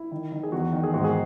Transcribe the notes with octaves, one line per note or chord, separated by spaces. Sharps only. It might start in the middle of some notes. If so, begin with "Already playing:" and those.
Already playing: E4
D#3
D#3
G#4
E2 F#4
D#3
G#4
G#2 F#4
G#4